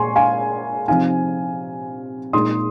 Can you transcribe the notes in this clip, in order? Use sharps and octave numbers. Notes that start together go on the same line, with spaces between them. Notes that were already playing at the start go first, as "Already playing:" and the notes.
Already playing: A#2 G#3 G#5 C6 C#6
F5 G#5
C3 F3 C4 D#4 F5 G#5
A#2 G#3 D#4 C6 D#6